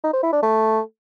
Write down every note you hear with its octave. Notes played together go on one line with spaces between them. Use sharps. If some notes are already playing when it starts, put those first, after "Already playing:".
D#4
C5
E4
D4
A3